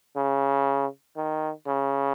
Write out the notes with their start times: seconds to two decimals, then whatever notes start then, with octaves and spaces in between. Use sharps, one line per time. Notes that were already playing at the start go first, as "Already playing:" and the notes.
0.16 C#3
1.16 D#3
1.67 C#3